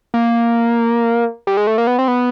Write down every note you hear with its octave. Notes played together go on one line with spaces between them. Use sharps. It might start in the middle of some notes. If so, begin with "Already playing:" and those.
A#3
G3
G#3
A3
A#3
B3
C4
B3